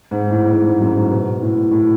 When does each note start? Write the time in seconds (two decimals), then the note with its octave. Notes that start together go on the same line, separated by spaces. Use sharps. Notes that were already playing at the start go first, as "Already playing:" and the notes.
0.11 G#2
0.31 A2
0.51 G#2
0.66 G#2
0.81 F#2
0.96 G#2
1.11 B2
1.41 A2
1.71 A2